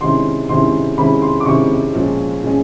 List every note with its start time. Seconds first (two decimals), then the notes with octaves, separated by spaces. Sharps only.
0.01 C3 D#3 G#3 C#4 E4 C6
0.49 C3 D#3 G#3 C#4 E4 C6
0.98 C3 D#3 G#3 C#4 E4 B5
1.22 C6
1.40 D6
1.46 C3 D#3 G#3 C#4 E4 C#6
1.94 A#2 F3 G#3 C#4
2.43 A#2 F3 G#3 C#4